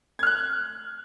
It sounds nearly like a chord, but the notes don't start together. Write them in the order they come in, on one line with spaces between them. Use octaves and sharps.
G#6 F6 F#6